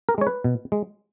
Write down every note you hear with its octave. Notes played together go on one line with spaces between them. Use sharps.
A#4
G#3 C#5
B4
B2
G#3